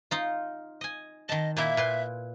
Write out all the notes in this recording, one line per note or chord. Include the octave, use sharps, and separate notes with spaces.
D#4 F4
D#5 G#5
D#3 D#5 A5
A#2 A#3 E4 E5
A#2 B4 C6